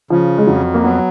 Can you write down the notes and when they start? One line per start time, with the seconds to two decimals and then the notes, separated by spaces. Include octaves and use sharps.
0.10 C#3 F3
0.38 G#3
0.47 F2 F#3
0.74 A#3
0.84 F#3 B3